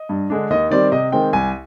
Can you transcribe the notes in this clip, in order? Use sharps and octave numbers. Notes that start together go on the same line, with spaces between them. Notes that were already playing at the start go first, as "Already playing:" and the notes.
Already playing: D#5
G2
D3 G#3 D4
D#2 D#5
D#3 G3 C4 D5
C3 D#5
D#3 G#3 C4 G5
C2 G#5